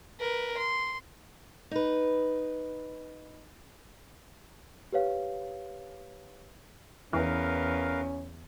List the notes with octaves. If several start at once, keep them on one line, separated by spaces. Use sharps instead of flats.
A#4 B4
C6
D#4 B4
G4 B4 C#5 F5
E2 E3 C#4 A#4 B4 F5